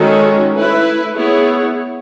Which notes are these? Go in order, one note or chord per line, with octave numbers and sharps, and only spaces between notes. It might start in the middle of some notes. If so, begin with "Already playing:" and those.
Already playing: D#3 G#3 C#4 F#4 A4
A3 E4 B4
B3 E4 G#4 C#5